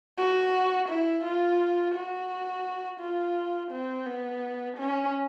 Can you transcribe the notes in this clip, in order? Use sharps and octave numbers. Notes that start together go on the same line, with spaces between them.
F#4
E4
F4
F#4
F4
C4
B3
C#4